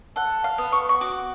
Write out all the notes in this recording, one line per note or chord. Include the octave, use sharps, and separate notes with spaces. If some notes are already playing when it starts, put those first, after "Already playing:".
A4 F#5
F5
B3
C#6
C#6
F#4 D6